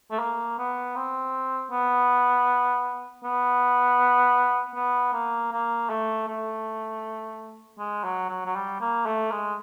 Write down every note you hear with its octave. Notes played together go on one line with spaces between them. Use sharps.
A3
A#3
B3
C4
B3
B3
B3
A#3
A#3
A3
A3
G#3
F#3
F#3
F#3
G3
A#3
A3
G#3